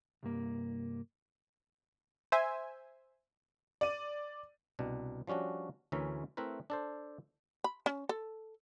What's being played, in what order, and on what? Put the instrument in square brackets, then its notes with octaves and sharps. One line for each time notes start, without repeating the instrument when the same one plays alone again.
[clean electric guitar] C2 G2 A#3
[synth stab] C5 E5 G#5
[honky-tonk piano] D5 D#7
[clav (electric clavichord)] C2 B2 D4
F3 G3 C#4 D4 F#4
D2 E3 C#4 A#4 E5
A3 C4 E4 A#4 B4
D4 A4 C5
[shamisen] B5
C#4
A4